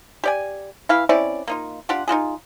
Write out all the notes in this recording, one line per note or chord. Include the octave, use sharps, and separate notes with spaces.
G4 D5 G#5
E3 E4 F5 B5
C4 C#4 E4 D5
A#3 D#4 F4
D4 F4 G4 F#5
D#4 F4 F#4 G#4